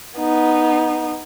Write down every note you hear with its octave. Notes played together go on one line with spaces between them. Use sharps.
B3 D#4